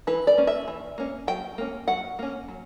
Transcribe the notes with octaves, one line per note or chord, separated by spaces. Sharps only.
E3 B4
D5
A#3 C#4
E5
E3
A#3 C#4
F#3 G5
A#3 C#4
F#3 F#5
A#3 C#4
F#3